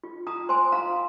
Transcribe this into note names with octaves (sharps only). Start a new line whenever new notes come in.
F4
F4 A#5 D#6
C5 G#5 C6
F4 F5 A#5